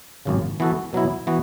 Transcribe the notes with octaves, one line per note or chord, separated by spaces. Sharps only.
G#1 F#2 C#3
E3 B3 F#4 A4
B2 F#3 B3 E4
E3 B3 F#4